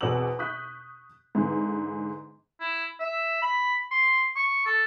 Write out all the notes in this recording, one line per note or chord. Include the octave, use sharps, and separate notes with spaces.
E2 B2 C4 D6 E6 F#7
C#6 D#6 F#6 G6 B6
G#2 D3 E3 B3
E4
E5
B5
C6
C#6
A4